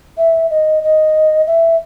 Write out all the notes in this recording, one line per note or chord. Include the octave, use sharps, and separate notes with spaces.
E5
D#5
D#5
E5